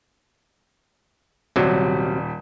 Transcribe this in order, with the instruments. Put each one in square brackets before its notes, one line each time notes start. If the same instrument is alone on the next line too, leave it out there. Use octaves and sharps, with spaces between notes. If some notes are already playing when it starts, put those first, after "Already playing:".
[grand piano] D#1 G3 [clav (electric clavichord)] C3 F#3